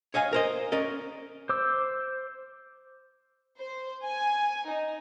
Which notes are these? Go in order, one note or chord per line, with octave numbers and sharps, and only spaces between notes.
C#5 D#5 F5 G#5
A#4 C5 D#5
C#4 A#4 D5 D#5
C5 D6 E6
C5
G#5
D#4